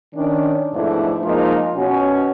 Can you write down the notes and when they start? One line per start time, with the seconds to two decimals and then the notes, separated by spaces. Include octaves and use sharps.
0.15 D#3 C#4 D4
0.74 F2 G#2 B2 A3 D4 E4
1.23 F3 G#3 A#3 D#4 F4
1.76 B2 C#4 F#4